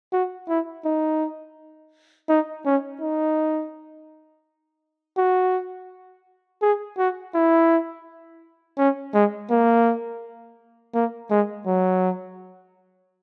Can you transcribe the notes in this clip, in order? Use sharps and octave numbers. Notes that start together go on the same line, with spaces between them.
F#4
E4
D#4
D#4
C#4
D#4
F#4
G#4
F#4
E4
C#4
G#3
A#3
A#3
G#3
F#3